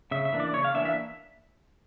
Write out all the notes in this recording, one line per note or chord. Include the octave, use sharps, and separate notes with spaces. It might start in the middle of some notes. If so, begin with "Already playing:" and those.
C#3 E5
E5
E3 A#3 D4
D5
C#3 C#5
F5
E3 A#3 D4 E5
E5